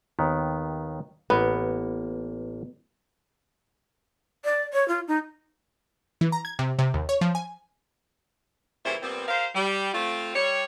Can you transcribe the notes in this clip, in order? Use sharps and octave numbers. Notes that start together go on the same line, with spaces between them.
D#2 D#3 B3
A1 A#3 B3
D5
C#5
F4
D#4
E3
A#5
G#6
C3
C3
D#2
C#5
F3
G#5
A#2 C#3 E3 G3 C5 E5
A#2 G3 B3 C4
G4 A#4 C5 F5
G3
A3 C4 F4
G3 C#5